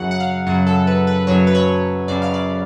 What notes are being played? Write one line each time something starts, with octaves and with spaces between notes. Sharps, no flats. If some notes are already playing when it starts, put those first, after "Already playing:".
Already playing: F#2 C#3 F#3 F#5
F#5
F5
F#2 C#3 F#3 F#5
A4
B4
B4
F#2 C#3 F#3 C#5
B4
C#5
F#2 C#3 F#3 D5
F5
D5